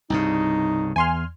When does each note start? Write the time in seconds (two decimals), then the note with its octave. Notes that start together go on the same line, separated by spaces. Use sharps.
0.10 C2 G2 C#3 D#4
0.96 E2 G#5 C6 F6